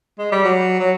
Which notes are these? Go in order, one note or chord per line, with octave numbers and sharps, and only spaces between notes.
G#3
G3
F#3
F#3